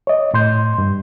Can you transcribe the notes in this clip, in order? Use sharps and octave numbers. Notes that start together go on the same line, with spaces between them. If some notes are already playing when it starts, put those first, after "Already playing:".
C#5 D#5
A2 C6 G6
G2